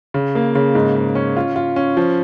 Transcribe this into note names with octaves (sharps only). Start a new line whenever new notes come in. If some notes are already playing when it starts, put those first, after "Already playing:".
C#3
A#3
C#3
G#2
G#2
C#4
F4
F4
C#4
F3